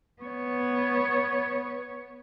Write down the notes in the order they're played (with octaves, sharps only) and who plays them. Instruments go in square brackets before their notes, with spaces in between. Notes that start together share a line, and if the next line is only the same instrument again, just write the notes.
[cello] B3 C#5